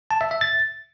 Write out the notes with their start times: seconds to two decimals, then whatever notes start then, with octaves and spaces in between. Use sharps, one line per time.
0.11 A5
0.21 E5
0.31 E5
0.41 A6